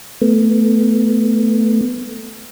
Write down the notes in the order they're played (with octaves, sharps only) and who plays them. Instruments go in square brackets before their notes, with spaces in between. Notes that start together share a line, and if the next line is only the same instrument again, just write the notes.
[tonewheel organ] A3 B3